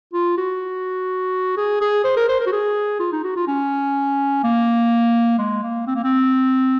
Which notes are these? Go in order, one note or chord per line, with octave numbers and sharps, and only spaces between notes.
F4
F#4
G#4
G#4
C5
A#4
C5
A#4
F#4
G#4
F4
D#4
F#4
F4
C#4
A#3
G#3
A#3
C4
A#3
C4